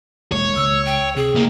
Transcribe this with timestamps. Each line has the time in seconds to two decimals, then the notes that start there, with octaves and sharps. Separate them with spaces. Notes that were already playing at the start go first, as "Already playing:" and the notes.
0.32 E1 G#3 A#3 C#5
0.56 C#2 E6
0.85 G5
1.16 C3 G#4
1.35 C#2 A#3